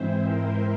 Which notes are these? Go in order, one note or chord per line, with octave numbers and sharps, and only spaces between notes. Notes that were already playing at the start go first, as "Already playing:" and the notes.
Already playing: G#2 E3 G#3 C4 E4 C5
A#4